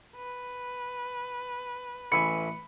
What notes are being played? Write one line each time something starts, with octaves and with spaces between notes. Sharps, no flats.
B4
A1 E5 G#5 B5 C#7